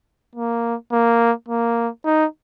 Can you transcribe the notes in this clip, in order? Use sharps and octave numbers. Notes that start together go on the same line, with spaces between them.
A#3
A#3
A#3
D#4